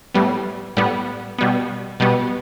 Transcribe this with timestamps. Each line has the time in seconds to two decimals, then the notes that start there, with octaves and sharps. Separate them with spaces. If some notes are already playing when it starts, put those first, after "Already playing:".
0.15 A2 G3 B3
0.77 A2 G3 B3
1.38 B2 G3 B3
2.00 B2 G3 B3